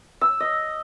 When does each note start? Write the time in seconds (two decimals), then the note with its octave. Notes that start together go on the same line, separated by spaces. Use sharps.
0.21 E6
0.40 D#5